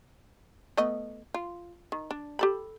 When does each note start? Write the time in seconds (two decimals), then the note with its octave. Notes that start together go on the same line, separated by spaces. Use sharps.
0.77 A3 B3 D#5
1.34 F4
1.92 D#3
2.11 D4
2.39 G4 A4 B5